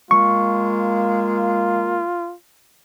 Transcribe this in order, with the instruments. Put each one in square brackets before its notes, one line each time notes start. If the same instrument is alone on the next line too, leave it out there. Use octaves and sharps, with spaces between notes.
[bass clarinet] G#3 [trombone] A#3 [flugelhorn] F4 [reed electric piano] C#6